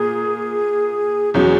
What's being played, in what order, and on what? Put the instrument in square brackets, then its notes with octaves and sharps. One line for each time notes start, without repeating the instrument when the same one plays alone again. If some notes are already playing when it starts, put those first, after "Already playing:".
Already playing: [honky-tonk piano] A#2 A#3 [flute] G#4
[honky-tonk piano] E2 B2 F#3 C#4 [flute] G#4